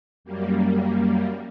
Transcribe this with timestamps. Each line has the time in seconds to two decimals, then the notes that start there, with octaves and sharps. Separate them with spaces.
0.24 F#2 G3 A#3